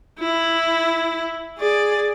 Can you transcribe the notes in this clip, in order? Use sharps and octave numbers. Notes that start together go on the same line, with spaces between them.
E4
G#4 D5